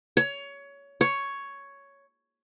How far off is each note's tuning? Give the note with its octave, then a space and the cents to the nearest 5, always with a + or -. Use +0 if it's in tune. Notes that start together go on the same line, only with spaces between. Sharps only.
C#5 +20
C#5 +5